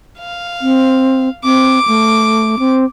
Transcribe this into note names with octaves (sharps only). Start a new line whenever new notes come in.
F5
C4
C4 D6
A3
C4